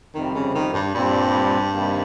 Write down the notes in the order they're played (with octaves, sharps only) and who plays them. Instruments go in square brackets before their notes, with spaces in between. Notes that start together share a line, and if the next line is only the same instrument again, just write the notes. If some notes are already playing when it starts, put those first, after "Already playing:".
[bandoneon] F2 C3 G3 [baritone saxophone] D#3
[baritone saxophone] C#3
D#3
G2
[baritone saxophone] G2 [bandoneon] A#2 G3 C4
[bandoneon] C3 D#3 G3 A#3